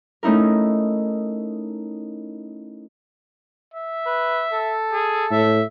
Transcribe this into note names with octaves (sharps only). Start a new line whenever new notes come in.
A3 C#4 D#4 E4 A#4
E5
B4
A4
G#4
A2 E5